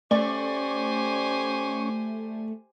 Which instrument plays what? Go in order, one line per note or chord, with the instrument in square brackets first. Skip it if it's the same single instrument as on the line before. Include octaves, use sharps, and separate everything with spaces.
[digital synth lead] A3 [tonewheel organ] C#4 C#6 [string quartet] G4 C5 G#5 [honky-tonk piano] D5